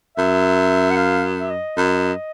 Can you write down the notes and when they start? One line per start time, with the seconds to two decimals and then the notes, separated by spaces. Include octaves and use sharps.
0.17 F#2 E5
0.91 F#5
0.97 F5
1.40 E5
1.50 D#5
1.77 F#2